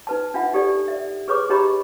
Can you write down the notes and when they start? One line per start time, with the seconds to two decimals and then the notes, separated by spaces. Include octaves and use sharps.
0.07 D#4 B4 A5
0.34 D4 F4 E5 F#5
0.53 D#4 G4 A4 D5
0.88 D5 E5
1.28 G#4 B4 C#5 C#6 D6
1.50 D#4 G4 C#5 D#5 A#5 B5